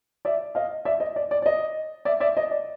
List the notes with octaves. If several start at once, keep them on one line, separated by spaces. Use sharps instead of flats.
D5 E5
D#5 F5
D5 E5
D#5
D5
D5
D5
D#5
D5 E5
D5 E5
D#5
D5